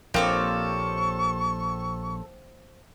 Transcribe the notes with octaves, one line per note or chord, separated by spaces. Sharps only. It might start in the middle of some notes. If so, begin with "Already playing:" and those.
A#1 F3 A#3 C4 G4 A4 C#5 C#6